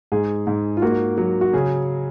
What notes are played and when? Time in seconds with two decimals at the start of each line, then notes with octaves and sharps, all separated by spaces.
0.12 G#2 G#4
0.47 G#2
0.77 F4
0.82 A#3 F#4
1.18 F#3
1.41 F#4
1.53 C#3 G#4